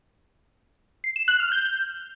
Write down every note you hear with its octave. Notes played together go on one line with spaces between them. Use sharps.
C7
E7
F#6
F6
G6